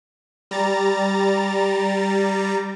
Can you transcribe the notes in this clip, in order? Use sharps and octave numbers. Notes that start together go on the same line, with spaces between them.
G3 A#5 A6